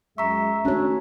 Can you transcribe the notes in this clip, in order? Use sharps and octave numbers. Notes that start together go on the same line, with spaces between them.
F#2 G#3 E5 A#5 C#6
D#3 A3 C#4 D4 F#4 C#5